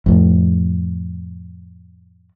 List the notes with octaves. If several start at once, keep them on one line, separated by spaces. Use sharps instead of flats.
F2 A2